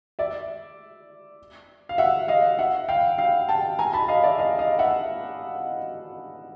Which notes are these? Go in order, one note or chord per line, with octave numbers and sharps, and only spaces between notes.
D5 E5
F5
E5 F#5
D#5 F5
E5 F#5
F5 G5
F5 G5
G5 A5
G#5 A#5
A5 B5
D#5 F5
D5 E5
D#5 F5
D#5 F5
E5 F#5